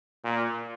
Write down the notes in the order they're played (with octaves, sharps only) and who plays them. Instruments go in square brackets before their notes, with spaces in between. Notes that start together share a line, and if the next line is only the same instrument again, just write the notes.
[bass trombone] A#2